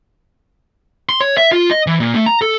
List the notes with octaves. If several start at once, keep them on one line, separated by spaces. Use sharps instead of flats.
C6
C#5
E5
F4
D#5
E3
A#2
A3
A#5
A4